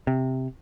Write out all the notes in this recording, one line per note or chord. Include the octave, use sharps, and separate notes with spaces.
C3